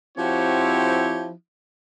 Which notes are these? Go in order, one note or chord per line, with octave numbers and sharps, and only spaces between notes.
F3 C4 E4 F#4 G4 C#5